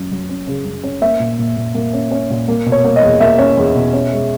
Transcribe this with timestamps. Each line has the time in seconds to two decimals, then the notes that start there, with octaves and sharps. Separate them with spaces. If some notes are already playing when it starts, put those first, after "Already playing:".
Already playing: F#2 F#3
0.11 F#3
0.29 C#4
0.47 C#3
0.65 F#2
0.83 C#4
1.01 A#3 E5
1.20 A#2
1.38 A#2
1.57 A#2
1.75 A#3
1.93 C#4
2.11 C#4
2.30 A#2
2.48 A#3
2.66 B2
2.72 C#5
2.84 A#3
2.96 D#5
3.02 E2
3.20 A#3 E5
3.38 C#4
3.57 E2
3.75 B2
3.93 C#4
4.12 G#3